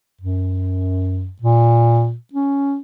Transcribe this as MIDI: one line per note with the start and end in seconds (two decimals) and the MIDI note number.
0.21 1.31 42
1.42 2.15 46
2.33 2.78 61